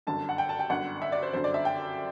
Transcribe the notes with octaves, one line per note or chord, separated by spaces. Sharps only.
G1 F#2 D3 A5
F#5
G5
A5
G5
G1 F#2 D3 F#5
E5
D5
C5
G1 F#2 D3 C5
D5
E5
G5